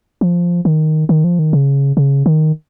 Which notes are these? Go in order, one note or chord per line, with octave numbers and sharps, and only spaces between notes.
F3
D#3
D#3
F3
D#3
C#3
C#3
D#3